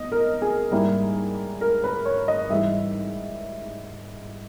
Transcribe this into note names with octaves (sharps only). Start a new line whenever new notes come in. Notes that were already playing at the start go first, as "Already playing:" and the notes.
Already playing: B2 D#5
A#4
G#4
G#2 G3 A#3 E4
A#4
B4
C#5
D#5
G#2 E3 G3 E5